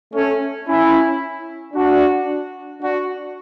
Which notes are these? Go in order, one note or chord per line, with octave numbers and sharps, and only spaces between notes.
A3 C#4
C#4 E4
D4 F#4
D4 F#4